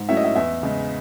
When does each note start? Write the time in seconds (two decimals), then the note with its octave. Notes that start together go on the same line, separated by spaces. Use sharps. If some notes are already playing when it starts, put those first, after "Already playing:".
Already playing: G#2
0.09 F#3 A3 C#4 E4 E5
0.17 D#5
0.24 E5
0.35 E2 E5
0.63 C#3 G#3